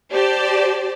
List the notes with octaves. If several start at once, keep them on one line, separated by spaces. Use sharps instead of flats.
G4 C5 D5 A5